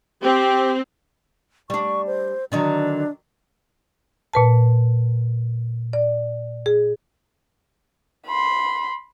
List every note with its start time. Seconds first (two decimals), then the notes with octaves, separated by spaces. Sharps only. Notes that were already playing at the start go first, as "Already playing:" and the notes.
0.23 C4 G4
1.70 G3 D4 C#6
2.07 C5
2.52 D3 D#3 F#3 D4
4.33 A#2 B4 A5
5.93 D5
6.66 G#4
8.26 B5 C6